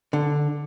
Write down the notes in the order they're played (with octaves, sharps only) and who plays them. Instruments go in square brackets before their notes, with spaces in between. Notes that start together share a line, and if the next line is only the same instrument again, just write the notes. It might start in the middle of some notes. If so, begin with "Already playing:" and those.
[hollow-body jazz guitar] D3